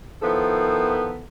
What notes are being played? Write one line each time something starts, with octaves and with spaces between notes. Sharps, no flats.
D#3 F3 B3 E4 A4